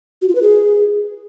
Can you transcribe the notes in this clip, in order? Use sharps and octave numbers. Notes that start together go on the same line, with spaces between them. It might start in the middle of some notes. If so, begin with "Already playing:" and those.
F#4
F4
B4
G#4